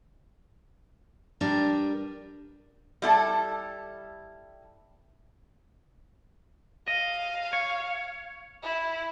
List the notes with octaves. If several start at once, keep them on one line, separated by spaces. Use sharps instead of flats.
G3 D4 A#4 B4
G3 E4 A4
D#5 F5
C#5
E4